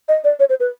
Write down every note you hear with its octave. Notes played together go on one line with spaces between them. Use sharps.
D#5
D5
C#5
C5
B4